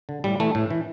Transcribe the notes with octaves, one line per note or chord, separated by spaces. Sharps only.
D3
A2 G3
E3 A3
A2
E3